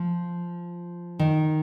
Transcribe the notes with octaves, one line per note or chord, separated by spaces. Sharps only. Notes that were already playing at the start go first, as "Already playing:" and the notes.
Already playing: F3
D#3